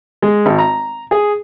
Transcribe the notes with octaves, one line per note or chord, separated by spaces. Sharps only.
G#3
G#1
A#5
G#4